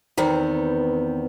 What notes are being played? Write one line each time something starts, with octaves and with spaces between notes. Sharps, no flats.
E2 D#3 B3 C4